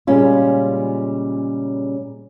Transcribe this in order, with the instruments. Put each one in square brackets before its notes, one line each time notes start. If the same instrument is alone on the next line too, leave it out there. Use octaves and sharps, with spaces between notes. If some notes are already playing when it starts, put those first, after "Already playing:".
[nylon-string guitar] A#2 C#3 G3 G#3 C#4 F4